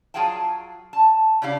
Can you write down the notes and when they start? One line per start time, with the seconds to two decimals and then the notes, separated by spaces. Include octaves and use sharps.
0.14 F#3 F4 G#4 F5 G5 A5
0.93 A5
1.42 C#3 D4 E4 G4 F5